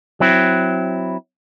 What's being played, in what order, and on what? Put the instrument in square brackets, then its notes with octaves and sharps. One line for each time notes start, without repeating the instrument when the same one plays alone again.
[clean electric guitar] F#3 C4 E4